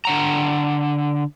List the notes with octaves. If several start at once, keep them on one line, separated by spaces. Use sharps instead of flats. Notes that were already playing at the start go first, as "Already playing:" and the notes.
D3 F#5 A#5